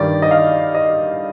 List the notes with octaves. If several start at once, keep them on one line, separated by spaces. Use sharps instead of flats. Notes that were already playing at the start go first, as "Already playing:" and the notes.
Already playing: G2 D#3 G3 D5
D#5
F5
D#5